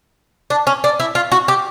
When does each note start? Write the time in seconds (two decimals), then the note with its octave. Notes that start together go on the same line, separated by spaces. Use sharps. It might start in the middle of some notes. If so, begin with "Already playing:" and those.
0.50 D4
0.67 C#4
0.84 D4
1.00 E4
1.15 F4
1.32 F#4
1.48 G4